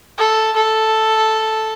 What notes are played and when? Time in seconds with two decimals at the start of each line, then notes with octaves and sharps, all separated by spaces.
0.18 A4
0.56 A4